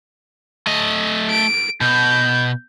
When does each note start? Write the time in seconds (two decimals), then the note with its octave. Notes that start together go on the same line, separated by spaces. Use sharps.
0.67 A3 D#5
1.31 D7
1.81 B2 G6